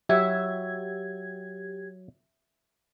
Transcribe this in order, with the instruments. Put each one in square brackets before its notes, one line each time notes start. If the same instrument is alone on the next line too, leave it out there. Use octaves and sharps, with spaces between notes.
[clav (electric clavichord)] F#3 [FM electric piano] G4 G#6 [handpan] E5